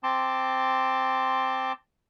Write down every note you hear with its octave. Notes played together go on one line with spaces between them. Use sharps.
C4 A5 C6 D6